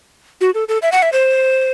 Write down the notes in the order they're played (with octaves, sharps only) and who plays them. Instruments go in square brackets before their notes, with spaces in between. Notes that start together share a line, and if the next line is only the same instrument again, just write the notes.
[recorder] F#4
A4
A4
E5
F#5
E5
C5